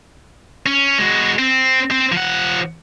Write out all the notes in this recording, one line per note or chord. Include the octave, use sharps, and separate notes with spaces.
C#4
G#3 F#4
C4
C4
F3 F#5